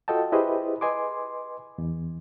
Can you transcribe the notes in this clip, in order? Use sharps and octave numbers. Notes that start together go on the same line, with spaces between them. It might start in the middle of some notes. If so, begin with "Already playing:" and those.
F4 F#4 A4 D#5 G5 A5
E4 G4 G#4 B4 C5 D#5
B4 D#5 G#5 C6 D6
E2